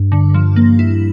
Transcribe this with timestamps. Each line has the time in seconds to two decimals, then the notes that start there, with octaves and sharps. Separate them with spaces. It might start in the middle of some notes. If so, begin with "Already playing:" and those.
Already playing: G2
0.12 D3
0.34 F3
0.56 A#3
0.79 E4